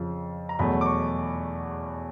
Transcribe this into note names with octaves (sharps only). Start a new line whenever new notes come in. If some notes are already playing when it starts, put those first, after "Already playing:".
Already playing: F2 C#3 F3
A#5
E2 B2 F#3 A3 B5
D6
C#6